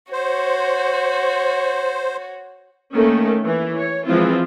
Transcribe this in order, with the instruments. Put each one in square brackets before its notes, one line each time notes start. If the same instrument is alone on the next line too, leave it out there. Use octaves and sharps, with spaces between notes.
[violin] F#4 C#5 [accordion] C5
[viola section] D#3 A3 A#3 C#4 A4
E3
C#5
E3 F3 G#3 C4 E4 F4